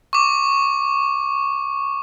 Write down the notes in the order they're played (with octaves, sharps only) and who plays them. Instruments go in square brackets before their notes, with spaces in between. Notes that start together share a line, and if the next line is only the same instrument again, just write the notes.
[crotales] C#6 D6